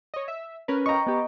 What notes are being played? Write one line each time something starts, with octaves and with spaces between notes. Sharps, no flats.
C#5 D#5
E5
C#4 A#4 B4
D#5 G5 A#5 C#6
B3 G4